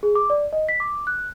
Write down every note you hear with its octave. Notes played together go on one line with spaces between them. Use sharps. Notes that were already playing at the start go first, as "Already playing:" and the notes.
G#4
D6
D5
D#5
B6
D6
F#6